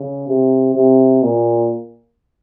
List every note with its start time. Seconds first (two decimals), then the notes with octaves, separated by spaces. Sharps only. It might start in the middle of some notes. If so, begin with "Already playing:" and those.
Already playing: C#3
0.28 C3
0.75 C3
1.23 A#2